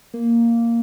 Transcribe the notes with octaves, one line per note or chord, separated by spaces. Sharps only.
A#3